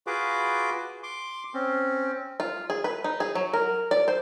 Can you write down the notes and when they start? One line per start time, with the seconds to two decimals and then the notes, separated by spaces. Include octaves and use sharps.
0.07 F4 F#4 G#4 B4 D6
1.03 C6 D6
1.54 C4 C#4
2.40 F4
2.70 G#4
2.84 B4
3.04 D#4
3.20 G#4
3.35 F#3
3.53 A#4
3.91 D5
4.08 C5